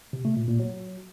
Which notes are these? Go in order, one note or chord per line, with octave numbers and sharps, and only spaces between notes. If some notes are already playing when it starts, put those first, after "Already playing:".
C3
A3
A#2
A#2
F#3